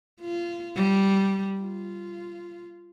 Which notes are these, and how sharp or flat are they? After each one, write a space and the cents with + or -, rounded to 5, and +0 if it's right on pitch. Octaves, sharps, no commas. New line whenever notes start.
F4 -25
G3 -10
F4 -15